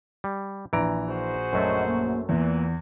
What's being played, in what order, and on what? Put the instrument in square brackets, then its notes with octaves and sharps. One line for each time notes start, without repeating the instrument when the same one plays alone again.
[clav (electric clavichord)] G3
[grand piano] A#1 A#5 D7 [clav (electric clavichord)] E3
[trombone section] F#4 G#4 C5
[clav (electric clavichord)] F#2 F#3 A3 [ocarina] D#5
[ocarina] A#3
[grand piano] E2 [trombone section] A#2 E3 [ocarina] A#3